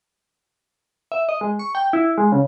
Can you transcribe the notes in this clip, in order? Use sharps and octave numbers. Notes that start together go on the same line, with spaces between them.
E5
D#5
G#3
C#6
G5
E4
G#3
C#3